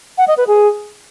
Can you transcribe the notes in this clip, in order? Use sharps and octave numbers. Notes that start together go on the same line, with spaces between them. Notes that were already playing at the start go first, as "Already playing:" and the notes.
F#5
D#5
B4
G#4